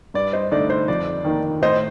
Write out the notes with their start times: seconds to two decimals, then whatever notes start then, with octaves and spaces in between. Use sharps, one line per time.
0.14 G2 D5
0.33 C5 D#5
0.52 D3 A3 D#4 D5
0.70 C5
0.88 F2 D5
1.25 D#3 A#3 D#4
1.62 A2 C5 D#5